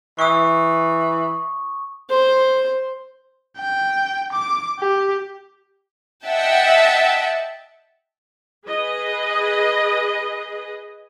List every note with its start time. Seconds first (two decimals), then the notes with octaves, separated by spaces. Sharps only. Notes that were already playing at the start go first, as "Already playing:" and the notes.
0.19 E3 C#6 D#6
2.10 C5
3.58 G5
4.33 D6
4.80 G4
6.25 D#5 E5 F#5 G5 A5
8.66 G#4 B4 D#5